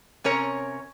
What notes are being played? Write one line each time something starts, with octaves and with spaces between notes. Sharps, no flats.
C3 C#4 A#4 C#5 A#5